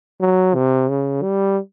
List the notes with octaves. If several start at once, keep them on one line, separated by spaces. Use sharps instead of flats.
F#3
C3
C#3
G3